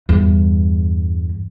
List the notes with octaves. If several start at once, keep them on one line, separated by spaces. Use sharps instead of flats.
E2 G2